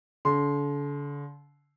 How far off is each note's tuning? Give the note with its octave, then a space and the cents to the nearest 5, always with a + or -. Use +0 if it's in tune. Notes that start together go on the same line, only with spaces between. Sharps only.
D3 -40 C6 -5